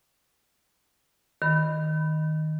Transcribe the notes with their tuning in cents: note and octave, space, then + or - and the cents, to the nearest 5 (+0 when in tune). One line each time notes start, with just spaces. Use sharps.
D#3 +0 B5 +0